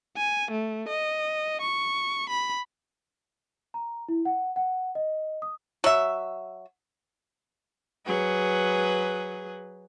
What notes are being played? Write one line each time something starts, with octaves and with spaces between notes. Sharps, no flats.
G#5
A3
D#5
C#6
B5
A#5
E4
F#5
F#5
D#5
D#6
F#3 E5
F#3 G#4 B4